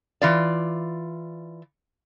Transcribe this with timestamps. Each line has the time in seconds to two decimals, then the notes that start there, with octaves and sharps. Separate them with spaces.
0.22 E3 F4 D5